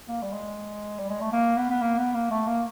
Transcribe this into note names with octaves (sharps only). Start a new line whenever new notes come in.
A#3
G3
G#3
G3
G#3
A3
A#3
B3
B3
A#3
B3
A#3
A3
A#3